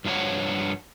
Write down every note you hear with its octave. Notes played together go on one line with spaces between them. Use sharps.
G2 F3 D4 C#5 F#5